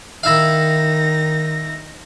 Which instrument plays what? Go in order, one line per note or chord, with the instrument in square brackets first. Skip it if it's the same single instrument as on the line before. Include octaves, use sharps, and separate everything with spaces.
[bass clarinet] D#3 [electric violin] D#4 A#6 [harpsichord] E4 E5 F5